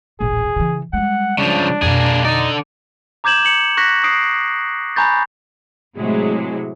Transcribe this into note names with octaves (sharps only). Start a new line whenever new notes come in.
D#1 A1 G#4
C#3 E3
G3 G#3 F#5
C#3 F3 D4
F2 B2 A#3 G#4
D3 D#4 D5
A#5 D6 G6 G#6 E7 F#7
C#7 F#7
C#6 F#6 A#6 B6
D#6 C7 D7
G#5 A#5 B5 C#6 G6 A6
A2 C3 F#3 G#3